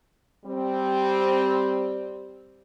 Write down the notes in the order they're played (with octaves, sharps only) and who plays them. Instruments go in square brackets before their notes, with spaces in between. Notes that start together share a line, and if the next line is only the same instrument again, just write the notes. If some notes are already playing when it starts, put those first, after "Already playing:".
[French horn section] G3 C4